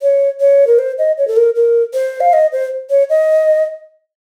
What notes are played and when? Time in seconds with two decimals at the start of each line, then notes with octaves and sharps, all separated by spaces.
0.02 C#5
0.40 C#5
0.67 A#4
0.79 C5
0.98 D#5
1.18 C#5
1.28 A4
1.37 A#4
1.55 A#4
1.94 C5
2.20 F5
2.33 D#5
2.52 C5
2.90 C#5
3.10 D#5